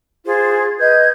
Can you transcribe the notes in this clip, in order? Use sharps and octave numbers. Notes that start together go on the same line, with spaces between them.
F4 G#4 C5
B4 D#5 G6 G#6